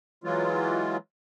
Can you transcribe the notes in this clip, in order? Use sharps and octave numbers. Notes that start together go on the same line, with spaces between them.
E3 F#3 G#3 F4